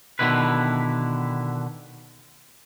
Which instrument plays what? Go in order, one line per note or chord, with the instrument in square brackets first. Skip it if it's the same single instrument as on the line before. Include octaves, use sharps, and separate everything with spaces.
[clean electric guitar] B2 D3 D#3 E4 B4